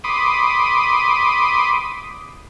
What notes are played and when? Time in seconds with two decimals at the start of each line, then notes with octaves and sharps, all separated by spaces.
0.04 B5 C6 D6 D#6